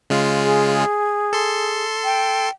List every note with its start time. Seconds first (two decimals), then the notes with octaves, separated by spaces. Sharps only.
0.10 C#3 G#3 F4
0.44 G#4
1.33 A4 C6
2.04 G5